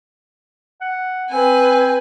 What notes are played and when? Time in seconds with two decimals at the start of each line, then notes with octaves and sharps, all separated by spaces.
0.81 F#5
1.30 C4 B4 G#5